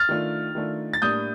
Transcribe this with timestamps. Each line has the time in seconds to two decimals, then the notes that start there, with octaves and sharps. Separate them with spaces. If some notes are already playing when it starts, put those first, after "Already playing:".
Already playing: F6 A6
0.09 D#3 A3 D4 F4
0.55 D#3 A3 D4 F4
0.93 A6
1.02 A2 G3 A#3 D4 D#6 G6